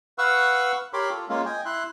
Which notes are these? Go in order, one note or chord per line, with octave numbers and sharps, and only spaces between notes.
B4 F5 F#5 C#6 E6
G4 A#4 C#5 B5 C6 D6
F4 A4
G#3 A#3 C#4 F4
D#5 G5 G#5
E4 E5 C6 F#6